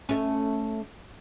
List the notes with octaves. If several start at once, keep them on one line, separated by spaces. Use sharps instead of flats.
A3 C#4